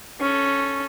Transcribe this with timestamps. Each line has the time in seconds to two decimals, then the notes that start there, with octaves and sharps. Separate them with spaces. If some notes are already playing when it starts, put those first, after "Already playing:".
0.20 C#4 A4